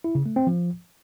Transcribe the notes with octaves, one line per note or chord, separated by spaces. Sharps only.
E4
C#3
A3
C4
F3